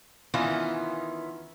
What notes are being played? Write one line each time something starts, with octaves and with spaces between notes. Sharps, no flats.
D#3 E3 B3 C#4 F4